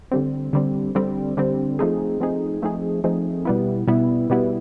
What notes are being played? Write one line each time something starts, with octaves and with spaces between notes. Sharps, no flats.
D3 G3 C4
D3 G3 C4
D3 G3 C4
D3 G3 C4
F3 A3 C4 D#4 G#4
F3 A3 C4 D#4 G#4
F3 A3 C4 D#4 G#4
F3 A3 C4 D#4 G#4
B2 G3 B3 E4
B2 G3 B3 E4
B2 G3 B3 E4